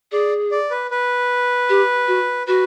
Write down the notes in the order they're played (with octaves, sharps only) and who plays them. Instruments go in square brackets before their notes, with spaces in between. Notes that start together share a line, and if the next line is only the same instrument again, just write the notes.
[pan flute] G#4 [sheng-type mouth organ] D5
[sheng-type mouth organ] D5
B4
B4
[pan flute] G4
F#4
[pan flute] F#4 [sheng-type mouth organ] B4